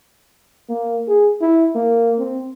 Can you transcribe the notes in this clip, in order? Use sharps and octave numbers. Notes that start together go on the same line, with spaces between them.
A#3
G#4
E4
A#3
C4